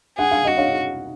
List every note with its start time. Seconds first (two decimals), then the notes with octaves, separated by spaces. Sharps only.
0.18 G#4 F#5
0.31 F5
0.45 F#4 D#5
0.57 C#5 F5